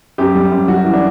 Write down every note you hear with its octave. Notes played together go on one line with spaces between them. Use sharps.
F#2 G4
G3
F#2
G3 F#4
E3
D4